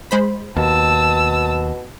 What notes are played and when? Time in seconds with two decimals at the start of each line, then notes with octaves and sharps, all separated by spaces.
0.11 G#3 C5 B5
0.56 D#2 B2 A5 E6